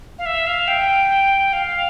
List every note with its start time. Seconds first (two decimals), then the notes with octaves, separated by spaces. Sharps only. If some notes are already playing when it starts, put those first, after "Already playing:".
0.18 F5
0.26 E5
0.47 F5
0.68 G5
1.53 F5